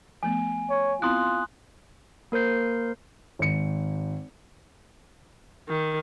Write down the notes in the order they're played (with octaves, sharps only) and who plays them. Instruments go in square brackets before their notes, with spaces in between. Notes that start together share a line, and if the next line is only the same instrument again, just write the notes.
[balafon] F3 A3 B3 [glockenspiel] G#5
[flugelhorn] C#5
[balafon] B3 C4 E4 [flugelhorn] F4 [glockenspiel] C6 D#6 F#6
[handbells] A#3 A#4 C5 G6 C7
[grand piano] G#1 C#7
[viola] D#3